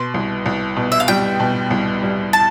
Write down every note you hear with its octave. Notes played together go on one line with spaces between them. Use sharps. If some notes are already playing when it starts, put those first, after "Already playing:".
Already playing: B2 C6
C2
C2
B2
E5
F5
G3 G5
B2
C2
G3
A5